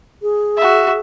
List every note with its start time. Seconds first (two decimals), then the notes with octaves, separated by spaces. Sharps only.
0.22 G#4
0.57 F#4 E5